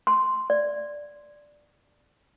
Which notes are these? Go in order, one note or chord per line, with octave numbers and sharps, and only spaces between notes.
C6
D5